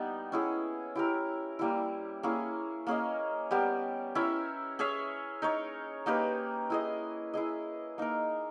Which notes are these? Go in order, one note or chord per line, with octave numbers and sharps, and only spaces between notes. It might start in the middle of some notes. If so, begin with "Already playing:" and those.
Already playing: G3 B3 D#4
C#4 E4 G#4
E4 G4 A#4
G3 A#3 E4
A#3 C#4 E4 G#4
A#3 C#4 G#4 D#5
G3 B3 G4 A#4
C#4 E4 A#4 E5
C#4 G#4 C#5 E5
D#4 A#4 C#5
A#3 D#4 G4 B4
E4 G#4 D#5
E4 G#4 D#5
A#3 D#4 A#4